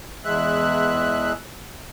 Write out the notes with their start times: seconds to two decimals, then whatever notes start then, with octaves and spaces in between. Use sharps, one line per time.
0.25 E2 G#3 E5 F#6